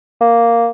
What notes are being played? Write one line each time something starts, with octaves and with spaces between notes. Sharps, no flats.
A#3